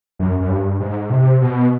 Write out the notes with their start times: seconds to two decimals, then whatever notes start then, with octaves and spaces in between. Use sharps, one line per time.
0.19 F#2
0.40 F#2
0.50 G2
0.80 G#2
1.10 C3
1.41 B2